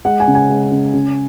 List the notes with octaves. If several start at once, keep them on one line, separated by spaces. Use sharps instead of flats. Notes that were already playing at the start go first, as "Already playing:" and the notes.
G#3 F#5
G#5
C#3
G#5
G#3
C#3
C#3